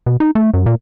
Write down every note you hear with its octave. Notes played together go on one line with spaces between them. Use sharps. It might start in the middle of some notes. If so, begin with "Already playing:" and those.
B2
D#4
A3
F#2
A#2